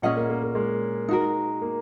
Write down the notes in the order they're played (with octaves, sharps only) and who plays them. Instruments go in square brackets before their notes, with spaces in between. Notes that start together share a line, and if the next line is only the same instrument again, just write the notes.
[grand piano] A#2 [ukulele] C#4 G#4 D#5 F#5
[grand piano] A#3
A#3
A#3
G#3
[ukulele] D#4 F#4 A#4
[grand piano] A#3